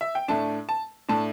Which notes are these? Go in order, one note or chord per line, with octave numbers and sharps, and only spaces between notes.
E5
G5
A2 A3 D4 A5
A5
A2 A3 D4 A5